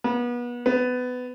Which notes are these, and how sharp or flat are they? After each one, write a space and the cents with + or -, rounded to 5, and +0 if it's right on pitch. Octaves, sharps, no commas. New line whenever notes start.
B3 -30
B3 +20